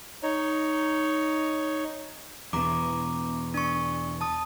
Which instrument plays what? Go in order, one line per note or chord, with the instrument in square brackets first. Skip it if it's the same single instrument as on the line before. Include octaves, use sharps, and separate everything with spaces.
[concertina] D#4 C#5
[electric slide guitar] E2 B2 [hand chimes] A#5 D6
[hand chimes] D4 C#6
A5 D#6